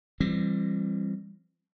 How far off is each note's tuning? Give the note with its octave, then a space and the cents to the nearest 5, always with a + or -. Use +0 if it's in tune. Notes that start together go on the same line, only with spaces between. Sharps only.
E3 +40 G3 +25 C4 +25